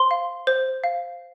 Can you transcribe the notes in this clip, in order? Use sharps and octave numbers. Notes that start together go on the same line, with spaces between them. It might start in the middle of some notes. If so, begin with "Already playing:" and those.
Already playing: C5 C6
F5
C5
F5